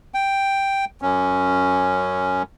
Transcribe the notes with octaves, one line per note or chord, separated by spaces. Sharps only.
G5
F#2 C#4